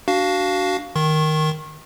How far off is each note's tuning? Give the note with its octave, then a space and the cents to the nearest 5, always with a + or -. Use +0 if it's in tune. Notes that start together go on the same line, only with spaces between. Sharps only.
D4 -10 F#4 +15 F5 +0
D#3 +0 C#6 -40